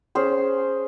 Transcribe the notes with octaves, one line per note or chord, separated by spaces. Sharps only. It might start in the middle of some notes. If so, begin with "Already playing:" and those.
C#4 G#4 C5